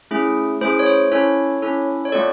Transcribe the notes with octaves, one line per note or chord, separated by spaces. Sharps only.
A3 C#4 E4 G#4
A3 C#4 E4 G#4 C5
C#5
C5
C#4 E4 A4 C#5
C#4 E4 A4
C#5
A3 C4 F4 A4 D5